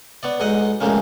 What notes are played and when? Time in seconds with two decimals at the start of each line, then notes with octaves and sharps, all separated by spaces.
0.23 B3 C#5 D5
0.40 B1 G#2 D#5 F#5
0.81 B1 F2 A2 G#3 A#3 C#4